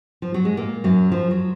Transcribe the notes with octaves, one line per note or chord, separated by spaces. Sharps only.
F3
F#3
G#3
A#2 A#3
F#2 F#3
F3
F#3